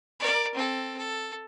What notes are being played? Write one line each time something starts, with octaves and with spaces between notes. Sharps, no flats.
A#4 D5
C4 A4
A4